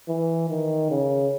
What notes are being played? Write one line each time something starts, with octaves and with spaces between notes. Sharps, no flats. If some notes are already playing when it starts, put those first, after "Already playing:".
E3
D#3
C#3